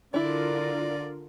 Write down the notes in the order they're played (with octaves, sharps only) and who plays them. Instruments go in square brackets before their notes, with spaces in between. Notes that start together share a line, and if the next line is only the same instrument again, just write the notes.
[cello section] D3 F4 A#4 [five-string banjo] D4 E4 [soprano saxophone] D5